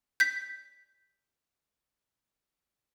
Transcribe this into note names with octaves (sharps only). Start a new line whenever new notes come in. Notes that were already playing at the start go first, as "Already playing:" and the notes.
G6 B6